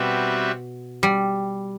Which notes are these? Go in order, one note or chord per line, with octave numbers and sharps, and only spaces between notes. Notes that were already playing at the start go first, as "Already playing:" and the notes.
Already playing: B2 G3 C4 F#4 B4 E5
G3